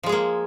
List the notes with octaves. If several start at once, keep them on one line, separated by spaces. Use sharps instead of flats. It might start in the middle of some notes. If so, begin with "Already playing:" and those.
F3 G#3 A#3 G#4